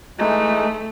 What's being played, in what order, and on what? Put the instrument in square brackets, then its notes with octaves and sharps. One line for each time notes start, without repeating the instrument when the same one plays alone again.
[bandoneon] E3 G#3 D#4 [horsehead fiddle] A3